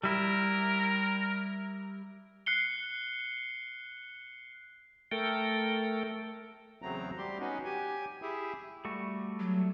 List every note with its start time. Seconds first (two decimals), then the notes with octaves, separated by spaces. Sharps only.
0.04 G3 E4 A#4
2.46 F#6 C7 C#7 G7
5.11 A3 A4 A#4 G5
6.82 E2 C#3 F#3 A3 C4 A#5
7.18 G3 G4 C6
7.40 B3 C#4 D#4 F#4
7.65 G4 G#5
8.22 E4 G4 G#4 E5
8.85 G3 A3 F#4
9.40 F#3